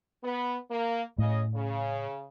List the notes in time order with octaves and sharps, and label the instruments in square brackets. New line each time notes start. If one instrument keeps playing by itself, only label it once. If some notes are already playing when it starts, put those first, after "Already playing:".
[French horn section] B3
A#3
[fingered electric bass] A2 [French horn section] C#3 D#5
[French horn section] C#3